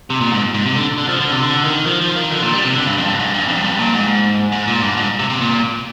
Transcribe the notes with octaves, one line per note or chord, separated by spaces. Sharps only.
C3
A#2
G#2
G#2
C3
D3
D3
F3
D3
C3
D3
D#3
F3
F3
D#3
D3
A#2
G3
C3
D3
G2
F2
G2
G#2
G2
F2
G2
A#2
G#2
G#2
A#2
G2
G#2
C3
C3
A#2